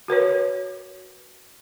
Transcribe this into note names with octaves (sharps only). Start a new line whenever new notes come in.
F#4 A#4 B4 C#5